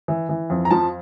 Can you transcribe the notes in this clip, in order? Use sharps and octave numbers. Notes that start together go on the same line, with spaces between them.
E3
E3
F2
A#5
F3 A5